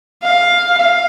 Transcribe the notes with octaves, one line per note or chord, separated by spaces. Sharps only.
F5
F5